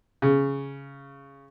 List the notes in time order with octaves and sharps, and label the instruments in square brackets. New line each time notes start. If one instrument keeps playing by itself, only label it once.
[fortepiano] C#3